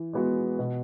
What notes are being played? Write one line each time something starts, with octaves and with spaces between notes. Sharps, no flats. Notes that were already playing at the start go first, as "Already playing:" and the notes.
Already playing: E3
G#3 B3 F#4
B2